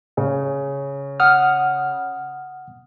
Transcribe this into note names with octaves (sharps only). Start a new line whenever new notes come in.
C#3
F#5 D#6 F6